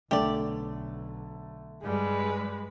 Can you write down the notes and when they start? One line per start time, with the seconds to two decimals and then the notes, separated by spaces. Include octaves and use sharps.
0.11 B1 D3 A3 G4 D5
1.83 G2 G3 G#3 B4